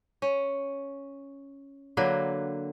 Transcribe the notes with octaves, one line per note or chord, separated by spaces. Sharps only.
C#4
D3 F#3 A#3 B4